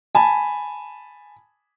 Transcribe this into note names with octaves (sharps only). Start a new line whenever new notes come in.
G#5 A5 B5